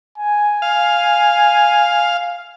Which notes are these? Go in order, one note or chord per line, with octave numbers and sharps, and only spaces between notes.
G#5
F5